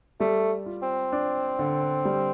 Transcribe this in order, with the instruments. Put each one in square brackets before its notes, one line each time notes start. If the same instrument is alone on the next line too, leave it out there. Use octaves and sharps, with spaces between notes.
[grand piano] G3 [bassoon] A3
[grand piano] F4
[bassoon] C4
[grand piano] D4
D3
G3